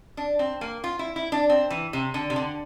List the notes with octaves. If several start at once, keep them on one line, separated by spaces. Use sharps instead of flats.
D4
C4
A#3
F4
E4
E4
D4
C4
E3
C3
D3
C3
D3